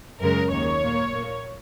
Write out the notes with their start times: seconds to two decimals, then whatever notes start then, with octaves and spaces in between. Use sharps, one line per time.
0.20 F#2 C#3 G#3 A#4
0.51 D#2 D#3 A#3 C#5
0.82 A#2 A#3
1.13 A#2 A#3